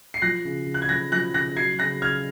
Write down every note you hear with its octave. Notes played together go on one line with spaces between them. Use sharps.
C7
F3 F#6 A#6
C#3
C#3
F#6
G#6
F3 F#6 A#6
F3 F#6 A#6
C#3 F#6 A#6
F#3 G#6 C7
C#3 F#6 A#6
C#3 F6 G#6